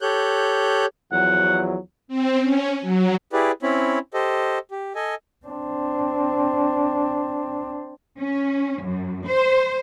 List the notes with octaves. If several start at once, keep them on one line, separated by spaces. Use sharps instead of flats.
G4 A4 C#5 F#6 G6
E2 F3 F#3 F#5
C4
C#4
F#3
E4 G4 G#4 B4 D5
C4 C#4 E4 C#5 B5
G4 A4 C5 D#5
G4
A4 D#5 G#5
C4 D4
C#4
F#2
C5